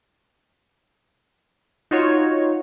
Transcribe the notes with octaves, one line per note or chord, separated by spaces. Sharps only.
D#4 F4 F#4 C#5